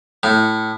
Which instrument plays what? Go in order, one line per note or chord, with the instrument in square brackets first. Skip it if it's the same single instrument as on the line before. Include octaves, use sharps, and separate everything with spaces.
[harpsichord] A2